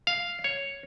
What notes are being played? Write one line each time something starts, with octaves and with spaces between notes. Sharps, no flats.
F5
C#5